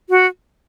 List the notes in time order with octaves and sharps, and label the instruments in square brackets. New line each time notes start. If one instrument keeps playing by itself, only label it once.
[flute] F#4